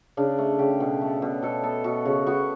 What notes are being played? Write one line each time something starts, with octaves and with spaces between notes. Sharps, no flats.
C#3 D4
A3
C#3 G4
B2
A3
B2
B2 A4
B3 A4
B2 F#4
C#3 F#4
B3 F#4